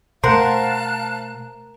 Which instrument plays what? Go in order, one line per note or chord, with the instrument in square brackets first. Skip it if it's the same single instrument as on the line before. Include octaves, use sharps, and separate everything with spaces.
[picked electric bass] B2 A3 [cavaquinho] A#4 [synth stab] C5 F#5 [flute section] F5 A5 F#6